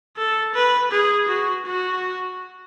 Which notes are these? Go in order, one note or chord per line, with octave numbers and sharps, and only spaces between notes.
A4
B4
G#4
F#4
F#4